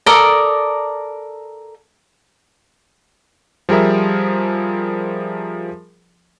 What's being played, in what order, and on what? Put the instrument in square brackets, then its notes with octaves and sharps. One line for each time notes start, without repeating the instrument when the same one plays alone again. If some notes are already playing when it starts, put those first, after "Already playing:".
[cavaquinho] A4 A#4 D5 D#6
[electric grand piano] F3 G3 G#4 A#4 E5